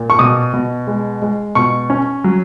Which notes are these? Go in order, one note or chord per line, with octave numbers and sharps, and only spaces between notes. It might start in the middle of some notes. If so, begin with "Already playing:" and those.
Already playing: A#2
C#6
B2 D#6
B2
G#3
G#3
B2 C#6
C#4
F#3